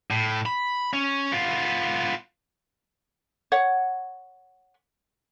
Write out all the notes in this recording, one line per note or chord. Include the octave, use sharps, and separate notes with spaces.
A2
B5
C#4
B3 F4
C#5 F#5